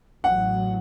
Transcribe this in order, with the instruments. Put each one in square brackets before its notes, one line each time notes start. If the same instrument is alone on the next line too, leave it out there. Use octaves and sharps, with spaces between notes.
[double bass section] A1 A2 F#3 [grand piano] F#5